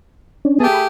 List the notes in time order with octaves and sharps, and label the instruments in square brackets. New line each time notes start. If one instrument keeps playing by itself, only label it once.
[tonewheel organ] C#4 D4
[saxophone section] A3 G4 G#4 [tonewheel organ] B3 A5
[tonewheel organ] B5